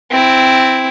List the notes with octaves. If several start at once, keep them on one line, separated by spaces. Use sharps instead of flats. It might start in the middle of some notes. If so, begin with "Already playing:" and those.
C4 E4